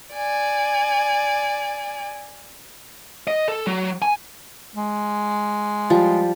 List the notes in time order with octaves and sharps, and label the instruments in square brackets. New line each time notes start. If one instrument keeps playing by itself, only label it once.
[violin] D5 G#5
[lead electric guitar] D#5
A4
F#3
G#5
[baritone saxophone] G#3
[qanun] F3 G3